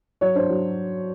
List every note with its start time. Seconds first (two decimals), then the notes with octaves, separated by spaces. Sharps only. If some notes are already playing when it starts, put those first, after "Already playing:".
0.21 F#3 C#5
0.35 D4 C5
0.50 F#3